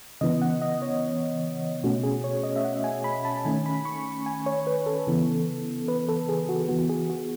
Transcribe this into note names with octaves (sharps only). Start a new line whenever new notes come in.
C#3 E3 B3 D#5
F#5
D#5
C#5
B2 A3 C#4 F#4
G#4
C#5
D#5
E5
F#5
G#5
B5
A5
D#3 A3 C#4 G#5
B5
C#6
G#5
C#5
B4
A4
C#3 E3 B3
B4
A4
G#4
F#4
E3 B3 F#4
G#4
F#4